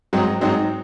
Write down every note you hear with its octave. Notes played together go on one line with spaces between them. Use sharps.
G#2 F#3 C4 D#4
G#2 F#3 C4 D#4